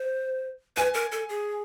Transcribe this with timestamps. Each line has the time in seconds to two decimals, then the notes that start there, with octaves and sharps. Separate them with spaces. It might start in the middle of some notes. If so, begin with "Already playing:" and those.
Already playing: C5
0.77 B4 G#5
0.94 A#4
1.12 A4
1.29 G#4